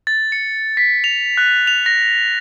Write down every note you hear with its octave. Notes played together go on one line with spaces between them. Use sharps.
A6
C#7
B6
F7
F#6
F7
A#6